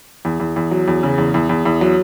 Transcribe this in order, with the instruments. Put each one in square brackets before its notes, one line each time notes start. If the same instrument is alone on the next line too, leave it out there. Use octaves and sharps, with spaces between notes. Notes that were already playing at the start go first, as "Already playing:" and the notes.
[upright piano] E2
E2
E2
F#3
E2
C#3
E2
E2
E2
E2
F#3